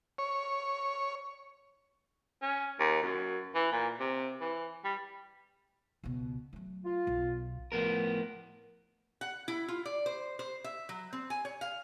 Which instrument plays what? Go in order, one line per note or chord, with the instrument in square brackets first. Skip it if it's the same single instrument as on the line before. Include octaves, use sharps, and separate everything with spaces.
[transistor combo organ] C#5
[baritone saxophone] C#4
D#2
F#2
E3
A#2
C3
E3
G3
[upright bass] C#2 B2
F#3 A3
[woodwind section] F4
[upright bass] B1 B2
[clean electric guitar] A2 F3 B3 A#4
[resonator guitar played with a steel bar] F#5
E4
F4
D5
C5
C5
E5
F#3
C4
G#5
C#5
F5